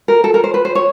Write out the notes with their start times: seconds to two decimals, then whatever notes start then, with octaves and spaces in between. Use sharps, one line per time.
0.08 A#4
0.24 A4
0.34 A#4
0.44 C5
0.54 B4
0.65 C5
0.75 C#5